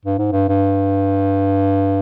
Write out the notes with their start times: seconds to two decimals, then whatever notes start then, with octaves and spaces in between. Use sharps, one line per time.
0.06 G2
0.19 G#2
0.32 G2
0.49 G2